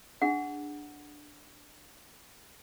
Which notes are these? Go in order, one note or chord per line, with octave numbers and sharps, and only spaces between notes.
D4 G#4 F#5